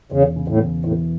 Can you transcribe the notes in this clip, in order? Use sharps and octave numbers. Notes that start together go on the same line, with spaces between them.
E1 C#3
C#3
A2
E1
A2 E3